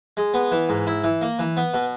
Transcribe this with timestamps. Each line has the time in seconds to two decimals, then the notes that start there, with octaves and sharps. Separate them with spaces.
0.17 G#3
0.34 B3
0.51 E3
0.69 G#2
0.87 E4
1.04 E3
1.21 A#3
1.39 E3
1.57 B3
1.74 B2